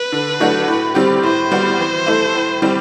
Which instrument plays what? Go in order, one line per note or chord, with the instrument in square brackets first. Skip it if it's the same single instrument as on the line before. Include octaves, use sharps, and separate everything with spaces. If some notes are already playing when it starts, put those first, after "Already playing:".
Already playing: [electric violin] B4
[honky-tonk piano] D3
F#3 A3 D4 F#4
A2
G3 C4 G4
[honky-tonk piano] A2 [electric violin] C5
[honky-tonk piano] G3 B3 F#4
E3
A3 E4
A2
G3 C4 G4